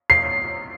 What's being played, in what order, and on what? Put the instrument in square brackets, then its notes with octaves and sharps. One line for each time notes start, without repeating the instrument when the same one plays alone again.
[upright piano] C7